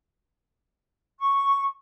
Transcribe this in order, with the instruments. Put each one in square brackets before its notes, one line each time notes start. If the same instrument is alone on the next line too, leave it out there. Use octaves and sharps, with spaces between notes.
[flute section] C#6